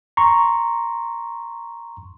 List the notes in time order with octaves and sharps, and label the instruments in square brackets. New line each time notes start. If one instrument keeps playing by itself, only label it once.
[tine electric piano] A#5 C6 C#6